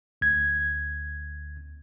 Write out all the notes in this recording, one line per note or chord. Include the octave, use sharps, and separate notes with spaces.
D2 G#6